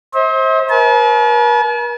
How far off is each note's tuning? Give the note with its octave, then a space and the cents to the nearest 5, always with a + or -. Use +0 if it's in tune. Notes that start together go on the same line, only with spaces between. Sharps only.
C5 +25 E5 -45
A#4 +45 A5 -45